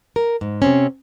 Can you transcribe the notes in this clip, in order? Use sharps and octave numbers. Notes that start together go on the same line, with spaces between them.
A#4
G#2
C3 C4 C#4